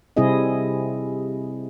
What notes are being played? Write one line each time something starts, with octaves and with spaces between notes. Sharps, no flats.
C3 G3 C4 E4 G#4 D#5